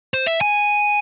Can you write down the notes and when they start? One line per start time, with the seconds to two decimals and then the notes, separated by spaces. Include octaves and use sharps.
0.14 C5
0.26 E5
0.41 G#5